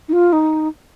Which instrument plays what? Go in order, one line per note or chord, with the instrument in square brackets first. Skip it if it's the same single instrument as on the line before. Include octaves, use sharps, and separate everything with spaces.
[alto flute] D#4
F4
D#4